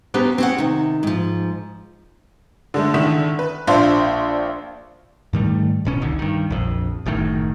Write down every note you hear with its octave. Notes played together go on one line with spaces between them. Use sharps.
B3 C#4 G4 B4 C5 A#5
C4 C#4 F#5
C3 D#3
G#2 F3
D3 G#3 A3
D3 D#3 E4 B6 E7
B4
A#1 D4 F4 C5 E5 F5
G#2 D#3 G3 A3
D1 B2 C#4
F1 C2 D3 D#3
G2 D#3
A#1 F2
F#1 F#2 A2 D#3